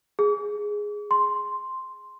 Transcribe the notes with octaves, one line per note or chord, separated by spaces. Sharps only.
G#4
C6